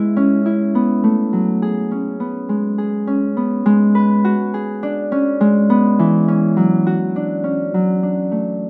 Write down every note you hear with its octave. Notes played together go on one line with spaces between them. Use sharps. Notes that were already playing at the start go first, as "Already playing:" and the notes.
Already playing: G#3 B3 E4
C#4
E4
B3
A3
F#3
G#4
C#4
B3
G#3
G#4
C#4
B3
G#3
B4
F#4
G#4
D4
C#4
G#3
B3
E3
C#4
F#3
F#4
D4
C#4
F#3
D4
A3